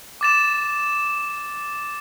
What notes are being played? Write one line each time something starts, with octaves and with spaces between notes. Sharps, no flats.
D6 A6 E7